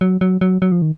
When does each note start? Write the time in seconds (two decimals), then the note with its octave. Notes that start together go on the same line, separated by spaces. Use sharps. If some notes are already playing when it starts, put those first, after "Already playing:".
0.01 F#3
0.21 F#3
0.41 F#3
0.62 F#3
0.72 F3
0.82 D#3